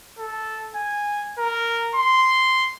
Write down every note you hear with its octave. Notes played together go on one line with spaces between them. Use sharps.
A4
G#5
A#4
C6